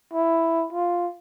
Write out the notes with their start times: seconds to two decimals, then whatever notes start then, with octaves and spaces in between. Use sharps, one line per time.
0.13 E4
0.73 F4